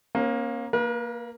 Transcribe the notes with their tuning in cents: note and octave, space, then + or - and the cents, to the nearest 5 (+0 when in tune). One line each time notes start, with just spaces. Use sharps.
A#3 +20 C#4 -35
A#3 +0 B4 -45